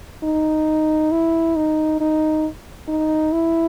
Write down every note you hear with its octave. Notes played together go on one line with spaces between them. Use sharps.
D#4
E4
D#4
D#4
D#4
E4